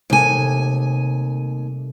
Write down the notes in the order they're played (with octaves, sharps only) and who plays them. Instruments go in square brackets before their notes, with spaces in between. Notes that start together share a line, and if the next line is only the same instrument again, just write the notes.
[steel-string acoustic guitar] D#2 G#5 [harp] C3 G3 A3